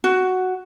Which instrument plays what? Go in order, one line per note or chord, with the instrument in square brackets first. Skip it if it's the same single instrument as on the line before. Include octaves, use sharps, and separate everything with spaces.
[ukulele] F#4